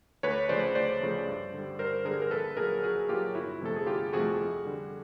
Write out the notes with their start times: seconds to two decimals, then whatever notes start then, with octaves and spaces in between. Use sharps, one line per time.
0.23 D2 B4 C#5
0.49 C#3 F3 A3 C5 D5
0.75 D2 C5 D5
1.01 C#3 F3 A3
1.27 G2
1.53 D3 G3
1.79 G2 A#4 C5
2.05 D3 G3 G#4 A#4
2.22 A#4
2.31 A#1 A4 B4
2.57 A#2 F#3 G#4 A#4
2.83 A#1 F#4 G#4
3.09 A#2 F#3 F4 G4
3.35 G1 E4 F#4
3.61 F2 C3 F3 A3 A4
3.76 G#4
3.86 G1 F4 G4
4.12 F2 C3 F3 A3 F#4 G#4
4.39 F2
4.65 D3 G3